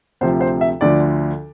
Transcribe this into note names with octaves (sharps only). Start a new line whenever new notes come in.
D2 C3 F3 C5
C5
E5
D2 D3 F3 D5